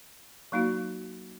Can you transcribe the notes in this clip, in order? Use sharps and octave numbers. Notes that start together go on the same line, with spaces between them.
F#3 A#3 D#4 F#4